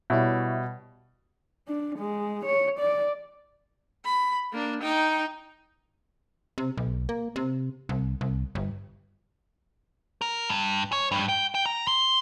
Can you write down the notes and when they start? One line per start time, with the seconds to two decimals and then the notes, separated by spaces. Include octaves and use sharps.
0.10 B2 G3 E4 C#5 E5
1.68 D4
1.98 G#3
2.45 C#5
2.79 D5
4.04 B5
4.53 A#3 D4
4.82 D#4 G5
6.58 C3
6.77 B1
7.09 A#3
7.36 C3
7.89 C2
8.21 C2
8.55 G1
10.21 A#4
10.50 G2
10.93 C#5
11.12 G2
11.29 G5
11.55 G5
11.66 A#5
11.87 C6